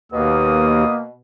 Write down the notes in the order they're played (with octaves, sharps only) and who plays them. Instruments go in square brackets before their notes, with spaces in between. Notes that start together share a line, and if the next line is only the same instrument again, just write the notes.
[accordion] D#2 [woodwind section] B2 [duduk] A#3 [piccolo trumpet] D#6